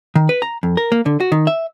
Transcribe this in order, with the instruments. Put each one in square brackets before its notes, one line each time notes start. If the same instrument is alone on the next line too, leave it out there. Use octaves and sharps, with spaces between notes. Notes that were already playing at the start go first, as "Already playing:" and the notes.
[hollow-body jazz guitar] D#3
B4
A#5
F2
A#4
A#3
D3
F#4
D#3
E5